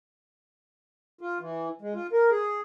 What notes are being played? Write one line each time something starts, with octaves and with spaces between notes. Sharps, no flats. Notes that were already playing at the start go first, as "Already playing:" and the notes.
F4
E3
G#3
F4
A#4
G#4